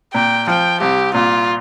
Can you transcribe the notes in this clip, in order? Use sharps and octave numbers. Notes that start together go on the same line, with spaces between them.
A#2 G5
F3 G5
C2 G4
A#2 F4